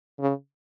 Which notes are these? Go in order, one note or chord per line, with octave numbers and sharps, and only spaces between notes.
C#3